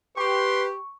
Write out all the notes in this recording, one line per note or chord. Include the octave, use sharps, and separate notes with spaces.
G4 B4 C6 C#6